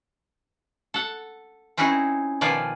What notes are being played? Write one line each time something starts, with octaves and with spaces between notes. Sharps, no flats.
A4 F#5
C4 C#4 D#4 E4 F#4 G#4
B2 D#3 F3 F4 D5 G#5